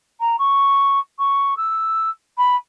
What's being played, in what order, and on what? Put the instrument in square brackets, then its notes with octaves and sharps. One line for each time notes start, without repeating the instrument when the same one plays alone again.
[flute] A#5
C#6
C#6
E6
B5